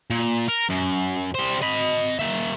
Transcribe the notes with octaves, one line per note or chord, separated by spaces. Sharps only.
A#2
A#4
F#2
G3 C5
D#5 B5
A#3 E5